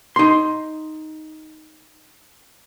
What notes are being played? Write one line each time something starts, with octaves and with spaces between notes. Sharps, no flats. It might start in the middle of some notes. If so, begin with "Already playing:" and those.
D#4 C6